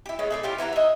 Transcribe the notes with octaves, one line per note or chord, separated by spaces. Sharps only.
E4 G4
G#3 A3 B3 C#4
A3 G#4 D5
C#4 E4 F4 G4
E3 E4 F#5 A#5
D#5 E5